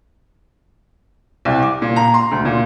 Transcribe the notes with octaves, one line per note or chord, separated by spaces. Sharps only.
C2
D6
A#2
A#5
C6
D2
A#2